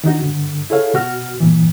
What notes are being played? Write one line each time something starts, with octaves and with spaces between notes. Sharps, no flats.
D#3 D4 D#4 F#4
G2 D3
E4 G#4 A4 C#5 F5
B2 F#4 F6
G2 A#2 E3